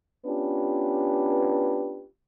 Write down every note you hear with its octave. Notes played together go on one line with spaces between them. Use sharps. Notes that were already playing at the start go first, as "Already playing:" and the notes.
B3 C#4 D4 F4 G4 B4